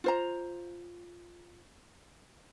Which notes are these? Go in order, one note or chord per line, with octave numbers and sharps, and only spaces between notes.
F4 C5 A#5